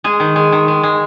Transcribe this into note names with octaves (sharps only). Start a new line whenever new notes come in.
G#3 G#4
D#3
G#3
D#3
G#3
G#3